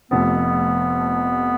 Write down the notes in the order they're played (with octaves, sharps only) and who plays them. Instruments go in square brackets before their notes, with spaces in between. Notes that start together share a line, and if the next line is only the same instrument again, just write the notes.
[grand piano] F1 F2 C3 F3 A3 [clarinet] B3